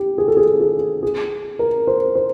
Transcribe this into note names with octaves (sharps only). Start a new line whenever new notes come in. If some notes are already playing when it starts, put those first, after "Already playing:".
Already playing: G4
G#4
A4
G#4
G#4
G#4
A#4
C5
C5